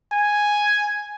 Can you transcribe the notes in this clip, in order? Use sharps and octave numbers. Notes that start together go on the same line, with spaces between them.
G#5